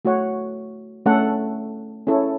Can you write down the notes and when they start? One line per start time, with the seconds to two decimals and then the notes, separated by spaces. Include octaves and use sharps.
0.05 A3 F#4 C#5 F#5
1.06 A3 C#4 A4 F#5
2.07 C#4 E4 A4 C#5